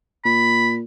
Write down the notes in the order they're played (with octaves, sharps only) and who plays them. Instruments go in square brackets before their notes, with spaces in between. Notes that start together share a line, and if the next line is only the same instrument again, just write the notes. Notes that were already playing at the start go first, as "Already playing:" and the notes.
[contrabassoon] A#2 [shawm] B5